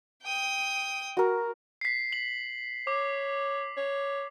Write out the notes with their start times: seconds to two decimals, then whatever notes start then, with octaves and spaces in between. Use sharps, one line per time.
0.23 G5 D#6
1.17 F#4 A#4
1.81 B6 C7
2.13 F#7
2.87 C#5 D6
3.77 C#5